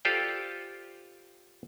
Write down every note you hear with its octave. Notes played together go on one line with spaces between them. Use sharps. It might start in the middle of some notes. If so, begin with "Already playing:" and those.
F4 G4 A4 C5 D5 F5